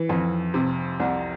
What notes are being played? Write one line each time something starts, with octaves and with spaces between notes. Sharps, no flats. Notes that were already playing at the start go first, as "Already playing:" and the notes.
Already playing: E3
F2
C3
C2